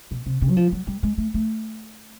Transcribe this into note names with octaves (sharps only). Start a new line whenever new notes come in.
B2
C3
C3
F#3
F3
F#3
G3
G#3
A3
A3